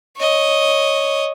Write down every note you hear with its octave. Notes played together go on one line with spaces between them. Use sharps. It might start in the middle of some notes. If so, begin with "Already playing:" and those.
C#5 D#5